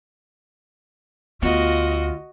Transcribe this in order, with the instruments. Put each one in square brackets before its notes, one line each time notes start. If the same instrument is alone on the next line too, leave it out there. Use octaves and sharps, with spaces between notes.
[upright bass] D2 B3 [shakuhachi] F4 [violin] F#4 D#5